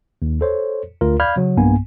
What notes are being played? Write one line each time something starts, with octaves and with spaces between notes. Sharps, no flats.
D#2
A4 C5 C#5
D2 F4 A#4
D5 F5 B5 F6 G6 G#6
C#3 F#3
B1 G2 A#3 B3 G#5